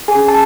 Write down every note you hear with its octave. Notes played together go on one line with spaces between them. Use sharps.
G#4 G#5
C#4
A5